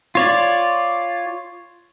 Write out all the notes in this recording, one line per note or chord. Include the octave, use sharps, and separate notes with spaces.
F4 C#5 D5